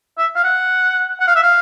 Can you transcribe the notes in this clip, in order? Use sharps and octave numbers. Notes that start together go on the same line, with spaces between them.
E5
F5
F#5
F#5
F5
E5
F5